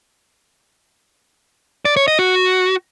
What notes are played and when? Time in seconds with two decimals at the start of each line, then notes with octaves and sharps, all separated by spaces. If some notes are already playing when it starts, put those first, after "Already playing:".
1.85 D5
1.97 C#5
2.08 D#5
2.19 F#4